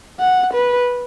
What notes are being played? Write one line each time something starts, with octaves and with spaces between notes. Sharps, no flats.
F#5
B4